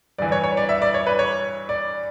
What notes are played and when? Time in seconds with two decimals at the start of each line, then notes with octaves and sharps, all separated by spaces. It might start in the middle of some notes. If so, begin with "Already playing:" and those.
0.18 G2 E3 D5
0.32 C#5
0.44 C#5
0.57 D5
0.69 E5
0.82 D5
0.94 C#5
1.06 B4
1.19 C#5
1.69 D5